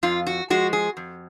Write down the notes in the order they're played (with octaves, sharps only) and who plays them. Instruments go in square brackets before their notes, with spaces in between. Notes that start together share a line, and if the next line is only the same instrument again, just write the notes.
[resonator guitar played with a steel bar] F2 F4
F#4
F3 G#3 F#4
G#4
F2